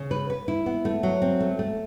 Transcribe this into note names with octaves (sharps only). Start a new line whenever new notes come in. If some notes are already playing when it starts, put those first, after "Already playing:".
Already playing: C#3
B4
B4
E4
B3
A3
F#3
C4
A3
A3